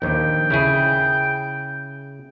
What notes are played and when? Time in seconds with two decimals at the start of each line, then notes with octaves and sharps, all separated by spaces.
0.02 A#1 D#2 G5
0.50 C#3 E4 G#4